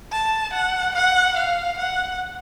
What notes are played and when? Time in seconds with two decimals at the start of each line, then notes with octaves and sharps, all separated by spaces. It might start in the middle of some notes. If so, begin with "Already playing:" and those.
0.12 A5
0.53 F#5
0.95 F#5
1.37 F5
1.78 F#5